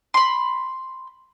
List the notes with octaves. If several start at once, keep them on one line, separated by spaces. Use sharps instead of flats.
B5 C6